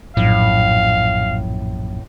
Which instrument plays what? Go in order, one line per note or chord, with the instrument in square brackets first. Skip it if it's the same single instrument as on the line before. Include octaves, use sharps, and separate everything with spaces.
[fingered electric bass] A#1 F#2 [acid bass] A2 [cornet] F5